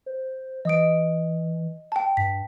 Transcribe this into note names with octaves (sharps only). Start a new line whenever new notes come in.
C5
E3 D#5 D#6 D7
G5 A5
G2 B6